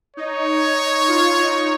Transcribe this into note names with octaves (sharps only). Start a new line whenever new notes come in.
D#4 C#5
F4
D#4